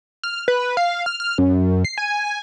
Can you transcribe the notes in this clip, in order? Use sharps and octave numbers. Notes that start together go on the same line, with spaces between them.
F6
B4
F5
F6
F6
F#2
C7
G#5